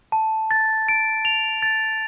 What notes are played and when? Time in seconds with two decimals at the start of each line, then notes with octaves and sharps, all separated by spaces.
0.12 A5
0.51 A6
0.89 D7
1.25 F7
1.62 A6